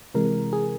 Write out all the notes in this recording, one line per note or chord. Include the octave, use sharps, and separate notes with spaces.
C3 E3 G#3 A#4
G#4